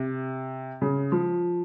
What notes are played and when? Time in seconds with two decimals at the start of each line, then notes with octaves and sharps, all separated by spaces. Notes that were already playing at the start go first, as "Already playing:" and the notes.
Already playing: C3
0.82 C#3
1.12 F3